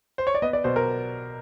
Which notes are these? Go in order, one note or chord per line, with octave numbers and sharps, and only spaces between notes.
C5
C#5
D5
B3 D#5
D5
B2 C5
A#4